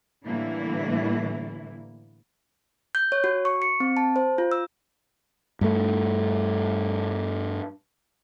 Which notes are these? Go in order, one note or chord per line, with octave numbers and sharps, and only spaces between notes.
A2 D3 E3 G3 A#3 E4
G6
C#5
F#4
C#6
C#7
C4
A5
C5
F4
E6
G2 A3